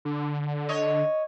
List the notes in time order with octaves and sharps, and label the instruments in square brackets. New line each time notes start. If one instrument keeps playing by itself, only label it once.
[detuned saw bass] D3
[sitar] C#5 D#5